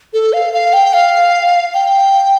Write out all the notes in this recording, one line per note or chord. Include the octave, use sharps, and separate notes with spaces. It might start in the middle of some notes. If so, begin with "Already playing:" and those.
A4
F5
F5
G5
F5
G5